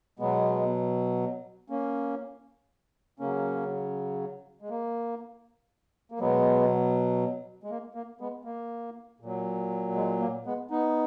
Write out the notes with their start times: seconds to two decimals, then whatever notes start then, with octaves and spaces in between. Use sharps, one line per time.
0.19 B2 F#3 G#3 B3
1.70 A#3 C#4
3.19 C#3 F#3 A#3 C#4
4.61 G#3
4.70 A#3
6.12 A#3
6.20 B2 F#3 G#3 B3
7.64 G#3
7.70 A#3
7.95 A#3
8.20 G#3 B3
8.45 A#3
9.20 A#2 F#3
9.96 G#3
10.20 A#3
10.46 G#3 B3
10.71 B3 D#4